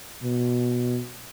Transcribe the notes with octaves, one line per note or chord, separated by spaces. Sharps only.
B2